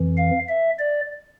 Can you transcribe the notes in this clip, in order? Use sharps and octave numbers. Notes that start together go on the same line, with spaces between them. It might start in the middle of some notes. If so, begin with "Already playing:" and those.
Already playing: F2 E3
F5
E5
D5